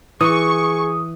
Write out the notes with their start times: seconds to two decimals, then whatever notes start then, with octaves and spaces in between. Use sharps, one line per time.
0.21 E3 G#4 C#6 D#6